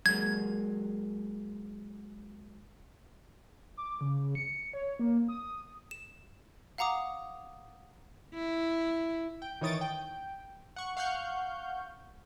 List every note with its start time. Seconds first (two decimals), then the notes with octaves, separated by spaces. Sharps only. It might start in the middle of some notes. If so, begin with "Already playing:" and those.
0.06 F#3 G#3 A#3 G#6
3.77 D6
4.01 C#3
4.35 C#7
4.73 C#5
4.99 A#3
5.29 D#6
5.91 E7
6.78 F5 F#5 A#5 D6 D#6
8.34 E4
9.42 G5
9.61 D#3 E3 C#5 D#6 A6 D7
9.81 G5
10.76 F#5 C#6
10.97 F5 F#5 C#6 F6 G6